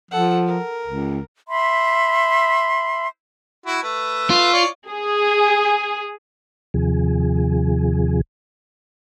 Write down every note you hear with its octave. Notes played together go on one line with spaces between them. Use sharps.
F3 A4 F#5
A#4
C#2
E5 B5 C6
E4 F#4
A3 B4
F4
C#5 D5
G#4
D#2 C3 F3 G#4